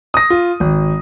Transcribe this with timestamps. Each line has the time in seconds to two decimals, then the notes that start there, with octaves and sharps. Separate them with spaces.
0.14 D#6 A#6
0.30 F4
0.60 G#1